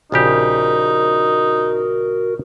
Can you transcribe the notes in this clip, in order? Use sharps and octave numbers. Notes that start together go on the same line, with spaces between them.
A#1 C#3 D#4 F#4 G4 A#4